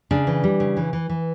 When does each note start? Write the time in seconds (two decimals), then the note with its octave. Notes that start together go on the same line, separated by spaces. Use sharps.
0.11 C#3 D4
0.27 E3
0.44 G3
0.60 C#3
0.77 E3
0.93 E3
1.09 E3